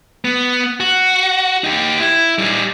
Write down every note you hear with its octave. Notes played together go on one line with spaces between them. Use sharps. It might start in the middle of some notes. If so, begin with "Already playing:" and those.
B3
F#4
D#4 G4
E4
G3 D#4